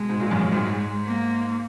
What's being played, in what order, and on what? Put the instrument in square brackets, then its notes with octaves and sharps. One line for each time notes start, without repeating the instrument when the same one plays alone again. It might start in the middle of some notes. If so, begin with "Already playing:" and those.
Already playing: [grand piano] B2 [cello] G#3
[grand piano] G#2
A#2
F#2
F#2
G#2
[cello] A#3